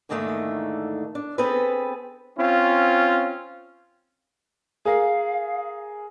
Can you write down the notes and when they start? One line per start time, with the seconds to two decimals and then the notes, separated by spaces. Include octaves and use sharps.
0.09 E2 G#2 D3 D#3 A3 A#3
1.15 D4
1.38 B3 C4 G#4 A4 B4
2.38 C4 C#4 F4
4.85 G#4 A#4 F5